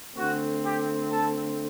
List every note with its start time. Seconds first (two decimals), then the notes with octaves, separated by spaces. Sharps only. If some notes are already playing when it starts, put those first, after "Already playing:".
0.16 D3 A3 C4 F#4
0.63 G4
1.10 A4